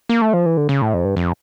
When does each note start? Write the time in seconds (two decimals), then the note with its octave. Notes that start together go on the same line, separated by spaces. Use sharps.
0.09 A#3
0.22 A3
0.33 F3
0.46 E3
0.57 D3
0.69 C#3
0.82 A2
0.94 F2
1.05 G2
1.17 F2